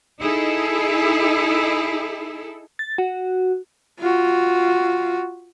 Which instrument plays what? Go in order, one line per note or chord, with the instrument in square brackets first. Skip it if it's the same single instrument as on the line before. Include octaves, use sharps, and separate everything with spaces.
[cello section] D#4 E4 G#4 A4
[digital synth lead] A6
F#4
[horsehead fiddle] F4 F#4